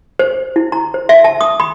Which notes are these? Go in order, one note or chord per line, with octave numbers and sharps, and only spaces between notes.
C5
E4
A#5
C5
E5
A5
D#6
B5